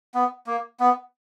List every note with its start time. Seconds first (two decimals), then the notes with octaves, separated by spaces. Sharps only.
0.14 B3
0.47 A#3
0.80 B3